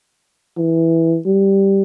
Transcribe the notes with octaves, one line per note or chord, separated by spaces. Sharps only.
E3
G3